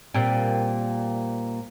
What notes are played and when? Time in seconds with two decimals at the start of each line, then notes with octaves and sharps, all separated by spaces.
0.14 A#2 G3 C4